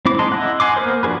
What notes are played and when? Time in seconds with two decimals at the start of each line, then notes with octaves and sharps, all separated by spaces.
0.06 C4 E4 D6
0.19 G#3 D#4 A5 C6
0.32 E4 D#5 F#5
0.60 F#5 G#5 C6 D6
0.76 A#3 B3 A#4 C5
1.03 F3 D4 F#4 G#4 B4